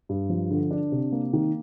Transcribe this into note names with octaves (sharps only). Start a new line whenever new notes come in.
G2
F3
D3
D4
C3
A#3
D#3